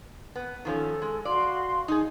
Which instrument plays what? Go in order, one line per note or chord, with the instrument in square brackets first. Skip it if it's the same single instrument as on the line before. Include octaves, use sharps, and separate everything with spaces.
[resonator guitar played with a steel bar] B3
[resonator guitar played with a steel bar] D#3 F3 C#4 [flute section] A4
[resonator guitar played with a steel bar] G#3
[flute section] F#4 F5 C6 [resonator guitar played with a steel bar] D5
[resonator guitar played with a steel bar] D#4 G#4